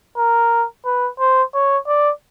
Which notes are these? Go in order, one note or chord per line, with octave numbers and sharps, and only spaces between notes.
A#4
B4
C5
C#5
D5